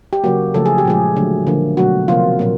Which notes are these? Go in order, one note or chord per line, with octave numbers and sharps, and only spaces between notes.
G4
C#3 F#3 A#3 F#4
C#3 F3 A3 A4
G#4
G4
A#2 F3 G#3 G#4
D3 F#3 A3
D3 F3 A#3
B2 F#3 A3 F#4
C3 F3 A#3 F4
A#2 F#3 A#3